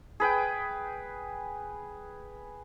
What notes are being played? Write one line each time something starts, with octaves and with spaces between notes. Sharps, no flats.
G#4 B4 G5